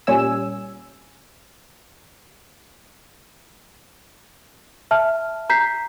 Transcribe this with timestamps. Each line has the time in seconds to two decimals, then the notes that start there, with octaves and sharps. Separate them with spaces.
0.07 A#2 G3 C#4 G#5 E6
4.91 E5 A5 F6
5.50 A#5 G6 B6 C7